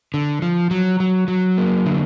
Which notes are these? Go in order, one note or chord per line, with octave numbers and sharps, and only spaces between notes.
D3
F3
F#3
F#3
F#3
A#3
D3